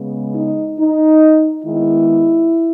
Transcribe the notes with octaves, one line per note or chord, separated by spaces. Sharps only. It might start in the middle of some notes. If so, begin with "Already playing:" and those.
Already playing: C#3 G#3 B3
D#4
D#4
D#3 G#3 B3 E4